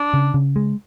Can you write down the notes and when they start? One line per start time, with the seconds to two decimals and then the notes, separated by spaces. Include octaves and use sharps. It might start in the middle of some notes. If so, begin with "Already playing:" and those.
Already playing: D4
0.14 C#3
0.34 C#3
0.56 G#3